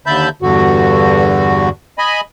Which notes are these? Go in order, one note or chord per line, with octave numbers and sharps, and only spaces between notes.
D#2 D3 E5 A5 B5 G6
E2 G2 D3 F#4
D#5 G#5 B5